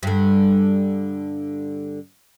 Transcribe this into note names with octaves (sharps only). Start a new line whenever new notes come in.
G2 D3